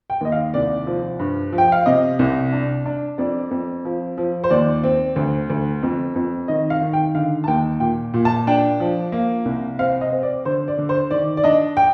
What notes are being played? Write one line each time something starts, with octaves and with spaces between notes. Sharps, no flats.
G5
D#2 D#5
F5
C2 D5
F3
G2
F3
G5
F5
C3 D#5
C2
D4
D4
F2 D5
F2
F3
F3
C5
D#2 D5
C4
D2
D2
F2
F2
D#3 D#5
F5
D#3
G5
D3 F5
A5
D#2 G5
A#2 G5
A#2
A5
D4 G5
F3
A#3
C2
C4 F5
D#5
C4
D5
D3 C5
D5
D3
C5
D#3 D5
D5
D4 D#5
G5